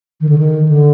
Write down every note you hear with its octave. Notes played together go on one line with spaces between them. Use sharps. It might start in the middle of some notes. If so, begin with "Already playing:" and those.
D#3
D3
D#3
D3